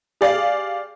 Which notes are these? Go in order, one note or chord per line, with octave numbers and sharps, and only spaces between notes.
G4 G#4 D5 F5